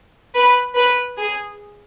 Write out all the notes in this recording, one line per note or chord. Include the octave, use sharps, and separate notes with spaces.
B4
B4
G#4